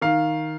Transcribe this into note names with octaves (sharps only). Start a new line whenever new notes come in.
D#3 F5